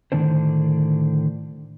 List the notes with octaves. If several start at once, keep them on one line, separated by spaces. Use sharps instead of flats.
A2 D3 D#3 A3 D4 C5